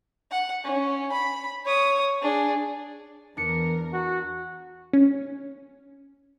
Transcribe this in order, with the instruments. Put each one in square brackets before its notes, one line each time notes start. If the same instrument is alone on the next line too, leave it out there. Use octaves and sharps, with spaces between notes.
[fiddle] F#5
C#4
B5
C#5 D#6
D4 G#4
[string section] E2 A#4 [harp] D4 C#7
[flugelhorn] F#4
[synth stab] C#4